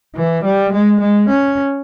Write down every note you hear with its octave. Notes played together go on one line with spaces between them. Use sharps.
E3
G3
G#3
G#3
C#4